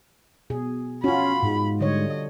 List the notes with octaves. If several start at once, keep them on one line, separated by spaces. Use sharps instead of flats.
B2 G#4
C#4 F4 F#4 B5
G#2
D3 G3 C#5 D#5